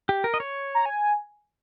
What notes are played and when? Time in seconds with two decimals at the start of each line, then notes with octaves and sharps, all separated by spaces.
0.09 G4
0.24 A#4
0.34 D#5
0.40 C#5
0.75 A#5
0.86 G#5